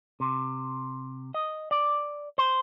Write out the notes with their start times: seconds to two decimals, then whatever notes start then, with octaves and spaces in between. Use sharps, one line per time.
0.20 C3
1.34 D#5
1.71 D5
2.38 C5